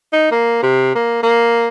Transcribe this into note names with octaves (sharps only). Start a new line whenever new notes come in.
D#4
A#3
C3
A#3
A#3